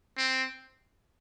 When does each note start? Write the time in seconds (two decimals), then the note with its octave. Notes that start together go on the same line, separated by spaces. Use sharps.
0.17 C4